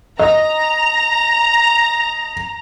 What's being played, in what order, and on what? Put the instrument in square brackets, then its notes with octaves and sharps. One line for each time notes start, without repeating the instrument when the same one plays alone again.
[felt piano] D#5 [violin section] A#5